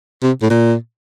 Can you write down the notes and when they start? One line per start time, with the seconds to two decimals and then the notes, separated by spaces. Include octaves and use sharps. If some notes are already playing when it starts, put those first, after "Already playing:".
0.23 C3
0.42 A2
0.50 A#2